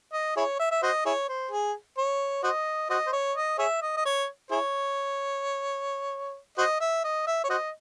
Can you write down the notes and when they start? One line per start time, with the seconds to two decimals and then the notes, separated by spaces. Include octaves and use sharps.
0.13 D#5
0.37 E4 G#4 C#5
0.59 E5
0.71 E5
0.83 F#4 C5 D#5
1.06 E4 G#4 C#5
1.29 C5
1.51 G#4
1.98 C#5
2.44 F#4 C5 D#5
2.90 F#4 C5 D#5
3.07 C5
3.13 C#5
3.35 D#5
3.59 G#4 C#5 E5
3.82 D#5
3.97 D#5
4.05 C#5
4.51 E4 G#4 C#5
6.58 F#4 C5 D#5
6.81 E5
7.04 D#5
7.27 E5
7.44 C#5
7.50 F#4 C5 D#5